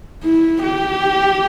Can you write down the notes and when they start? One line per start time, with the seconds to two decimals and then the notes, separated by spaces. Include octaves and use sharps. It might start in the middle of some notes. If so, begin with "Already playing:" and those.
0.23 E4
0.62 G4